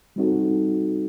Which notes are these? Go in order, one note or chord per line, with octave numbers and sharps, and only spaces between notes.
G3 C4 D#4 F#4 A4